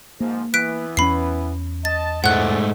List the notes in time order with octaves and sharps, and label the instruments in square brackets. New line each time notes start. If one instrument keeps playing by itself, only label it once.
[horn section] G#2 F3 [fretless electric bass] A#3
[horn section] E3 B3 [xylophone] F#6 B6 D7
[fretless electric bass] E2 C4 C#4 [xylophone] B5 C7
[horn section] D#5 A5 [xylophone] A6
[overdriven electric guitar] G#2 A3 [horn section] G#3 D5 [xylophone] F#5 F#6